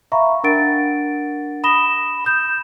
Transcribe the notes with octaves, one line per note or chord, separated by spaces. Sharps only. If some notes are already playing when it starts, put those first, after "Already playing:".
E5 F5 A#5 B5 C#6
D4 A#4 F#5 A6 D7
B5 D#6 A#6 E7 G7
B5 D#6 G6 E7